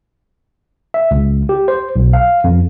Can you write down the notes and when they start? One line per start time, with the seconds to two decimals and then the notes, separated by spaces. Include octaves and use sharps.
0.94 E5
1.11 C#2
1.49 G4
1.68 C5
1.96 B1
2.13 F5
2.44 F2